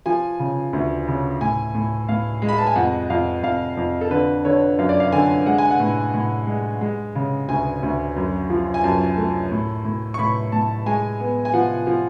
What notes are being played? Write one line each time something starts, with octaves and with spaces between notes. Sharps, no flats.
F3 G#5
C#3
D2
C#3
A2 G#5
A2
A2 F5
G#3
B5
A5
G#5
F2 F#5
F2 F5
F2 F5
F2
A4
D3 B4
D3 C#5
F#2 F5
D5
F5
D3 G#5
G#3 F#5
G#5
F#5
A2
A2
G#3
G#3
C#3
D2 G#5
D2
F#2
F3
G#5
F#2 A5
A3
A2
A2
C#6
A2 B5
A2 A5
G#3 G#5
B3
G#5
F3 F#5
F3